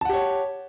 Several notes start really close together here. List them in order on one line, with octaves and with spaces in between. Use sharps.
A5 F#5 G4 C#5